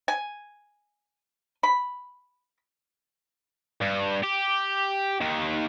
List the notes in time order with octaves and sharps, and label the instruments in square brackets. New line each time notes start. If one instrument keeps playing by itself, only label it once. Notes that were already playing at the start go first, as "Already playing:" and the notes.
[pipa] G#5
B5
[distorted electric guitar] G2
G4
D#2 D#3